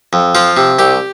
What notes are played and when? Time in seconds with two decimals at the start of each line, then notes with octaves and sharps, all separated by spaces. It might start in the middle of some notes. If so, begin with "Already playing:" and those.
0.13 F2
0.35 F3 F4
0.57 C3
0.79 C2 G4